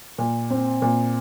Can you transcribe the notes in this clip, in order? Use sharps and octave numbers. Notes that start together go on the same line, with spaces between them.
A#2
C4
A#2